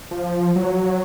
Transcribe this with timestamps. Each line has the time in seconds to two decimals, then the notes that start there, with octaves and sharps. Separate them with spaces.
0.11 F3
0.56 F#3